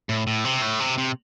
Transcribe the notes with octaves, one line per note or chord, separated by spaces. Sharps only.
A2
A2
C3
A2
C3
C3